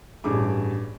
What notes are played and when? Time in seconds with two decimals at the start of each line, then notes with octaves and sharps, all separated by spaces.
0.24 A1 G2 B2 B3 G#4 D6